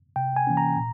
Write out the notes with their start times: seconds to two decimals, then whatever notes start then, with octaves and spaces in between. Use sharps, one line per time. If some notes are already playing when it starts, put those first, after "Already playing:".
0.16 C3 G5
0.36 G#5
0.47 E3 A#3 C#4
0.57 A#5
0.77 A#2